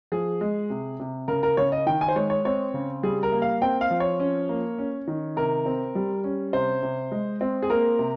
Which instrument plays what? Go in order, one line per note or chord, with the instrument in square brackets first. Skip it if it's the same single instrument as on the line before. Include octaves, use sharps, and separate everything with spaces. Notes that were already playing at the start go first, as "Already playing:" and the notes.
[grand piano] F3 G#4
G#3
C3
C3
C#3 A#4
A#4
C#3 C#5
D#5
D#3 G5
G#5
C5
G#3 C#5
C#5
C4 C#5
C#3
G3 G#4
A#4
A#3
F5
C4 G5
F5
F3
C#5
C#4
A#3
C#4
D#3
C3 A#4
C4
G3
C#4
C3 C5
C3
G#3
C4
G#4
A#3 A#4
C3